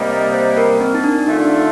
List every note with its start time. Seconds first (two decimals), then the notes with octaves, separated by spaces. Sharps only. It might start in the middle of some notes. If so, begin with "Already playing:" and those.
Already playing: C3 G3 A#3 D#4
0.11 D#5
0.34 C5
0.57 A#4
0.81 C4
0.94 D#4
1.04 D4
1.27 D3 A3 D4 D#4 F4